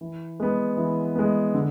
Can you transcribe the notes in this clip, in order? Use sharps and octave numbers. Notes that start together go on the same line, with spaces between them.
E3
G#3 B3
E3
G#3 B3
D3